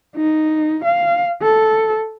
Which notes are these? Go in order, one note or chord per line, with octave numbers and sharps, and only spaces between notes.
D#4
F5
A4